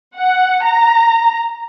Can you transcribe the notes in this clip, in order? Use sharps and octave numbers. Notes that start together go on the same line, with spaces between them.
F#5
A#5